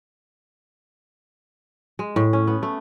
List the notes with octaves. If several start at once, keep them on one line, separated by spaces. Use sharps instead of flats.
G#3
A2
C#4
B3
A3